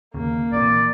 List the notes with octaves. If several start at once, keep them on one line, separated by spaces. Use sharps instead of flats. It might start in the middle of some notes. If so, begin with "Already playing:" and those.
D1 D#2 C#3 A#3
A#1 C3 E3 D5